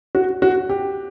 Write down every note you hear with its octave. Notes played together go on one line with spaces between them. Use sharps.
F#4
F#4
G4